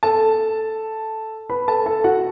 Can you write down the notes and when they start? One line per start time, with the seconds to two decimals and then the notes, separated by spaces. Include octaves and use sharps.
0.03 A4 A5
1.50 B4 B5
1.68 A4 A5
1.86 A4 A5
2.04 F#4 F#5